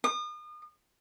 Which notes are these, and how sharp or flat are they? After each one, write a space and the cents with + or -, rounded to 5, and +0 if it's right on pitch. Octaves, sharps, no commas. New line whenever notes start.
D#6 -40